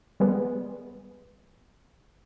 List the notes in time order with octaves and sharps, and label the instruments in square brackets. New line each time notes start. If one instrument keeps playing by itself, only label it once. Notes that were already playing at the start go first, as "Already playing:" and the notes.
[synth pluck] G3 G#3 B3 B4